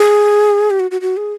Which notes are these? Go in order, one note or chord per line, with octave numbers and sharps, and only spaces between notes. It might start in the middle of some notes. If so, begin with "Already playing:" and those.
Already playing: G#4
G4
F#4
F#4
F#4
G#4